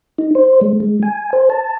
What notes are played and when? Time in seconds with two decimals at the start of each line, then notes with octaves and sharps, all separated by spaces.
0.18 D#4
0.35 C5
0.61 G#3
0.80 G#3
1.03 G#5
1.33 C5
1.50 A5